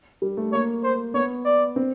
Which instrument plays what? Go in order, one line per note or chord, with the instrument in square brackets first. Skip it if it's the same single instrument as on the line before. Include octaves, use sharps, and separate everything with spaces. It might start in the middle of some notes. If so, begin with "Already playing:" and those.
[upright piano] G3
A3
[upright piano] A#3 [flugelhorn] C#5
[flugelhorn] C5
[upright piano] B3 [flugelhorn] C#5
[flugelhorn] D5
[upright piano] C4